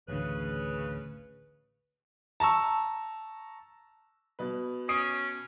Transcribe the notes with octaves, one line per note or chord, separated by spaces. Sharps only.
A1 D2 C#3 B4
A5 A#5 C#6 E6
B2 B4
C#4 D#6 C7 D7